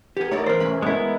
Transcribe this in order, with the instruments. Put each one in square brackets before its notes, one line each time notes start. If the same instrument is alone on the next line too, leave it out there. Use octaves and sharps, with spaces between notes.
[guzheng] B3 A#4 [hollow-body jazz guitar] G4 G#4
[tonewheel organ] A3 D#4 D5 [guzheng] A#3 E4 F5 [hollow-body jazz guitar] C#5
[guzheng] E3 C4 [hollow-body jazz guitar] A#4 C5
[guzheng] C3 B4 B5 [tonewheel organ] A3 C#4
[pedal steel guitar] G#3 B3 E4 [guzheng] A#3 D#4